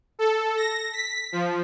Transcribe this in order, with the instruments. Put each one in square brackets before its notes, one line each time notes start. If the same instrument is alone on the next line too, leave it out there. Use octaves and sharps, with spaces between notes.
[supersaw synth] A4
A#6
B6
F3